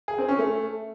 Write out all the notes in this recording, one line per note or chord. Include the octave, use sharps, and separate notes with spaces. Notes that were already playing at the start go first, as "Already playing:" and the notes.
G#4
C4
C#4
A3